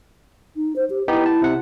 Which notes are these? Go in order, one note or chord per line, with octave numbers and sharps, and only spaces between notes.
D#4
C5
G4
B3 D#4 E4 G4
A5
C3 F#5